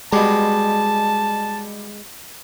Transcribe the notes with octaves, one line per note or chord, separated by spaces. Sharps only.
B2 G3 G#3 A5